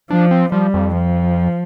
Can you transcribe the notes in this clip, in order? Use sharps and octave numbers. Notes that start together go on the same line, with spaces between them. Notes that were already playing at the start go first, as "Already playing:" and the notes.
F3 D4
C4
F3 G3
F2
F3